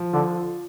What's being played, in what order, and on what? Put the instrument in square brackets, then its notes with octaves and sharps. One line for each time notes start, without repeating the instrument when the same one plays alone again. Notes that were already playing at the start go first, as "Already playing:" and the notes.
Already playing: [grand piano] F3
[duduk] D3 [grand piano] F4